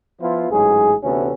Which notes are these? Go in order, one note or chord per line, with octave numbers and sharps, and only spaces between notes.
F3 B3 E4 F4
A1 G#2 F#3 G#4
D2 C3 E3 A3 B3 C#4